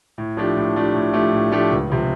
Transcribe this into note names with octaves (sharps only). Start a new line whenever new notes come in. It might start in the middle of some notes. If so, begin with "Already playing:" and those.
A2
F3 A3 D4 G4
A2
F3 A3 D4 G4
A2
F3 A3 D4 G4
A2
F3 A3 D4 G4
C#2
C3 F3